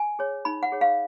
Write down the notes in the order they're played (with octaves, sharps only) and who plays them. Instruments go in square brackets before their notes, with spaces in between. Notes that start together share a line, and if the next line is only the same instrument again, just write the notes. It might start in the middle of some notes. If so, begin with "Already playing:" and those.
Already playing: [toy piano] G#5
G#4 C#5
D#4 B5
F#5
G#4 C#5
F5